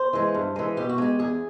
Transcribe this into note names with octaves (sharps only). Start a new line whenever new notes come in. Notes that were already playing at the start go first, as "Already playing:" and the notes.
Already playing: C5
E3 G#3
G2
E3 G#3
B2 G4
F#4
G#3 G4
E2 G#4